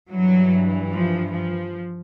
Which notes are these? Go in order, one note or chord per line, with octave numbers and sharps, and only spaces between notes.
G2 E3 F#3
F3
F3